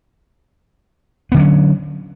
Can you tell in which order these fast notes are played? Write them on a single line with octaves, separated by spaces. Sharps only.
B3 D3 F#3 C#4